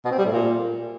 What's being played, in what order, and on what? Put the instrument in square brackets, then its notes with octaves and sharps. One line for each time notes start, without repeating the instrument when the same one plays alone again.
[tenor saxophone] B2
C4
G3
A2
A#2